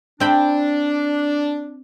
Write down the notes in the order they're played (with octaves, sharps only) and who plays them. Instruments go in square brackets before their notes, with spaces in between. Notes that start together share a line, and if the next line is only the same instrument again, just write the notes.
[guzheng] C4 G5 B5 [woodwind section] D4